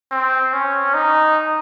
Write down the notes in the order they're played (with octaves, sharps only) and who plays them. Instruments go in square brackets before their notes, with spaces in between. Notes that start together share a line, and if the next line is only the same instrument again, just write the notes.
[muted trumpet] C4
C#4
D#4